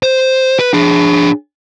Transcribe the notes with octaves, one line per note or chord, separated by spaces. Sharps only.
C5
B4
D4 G#4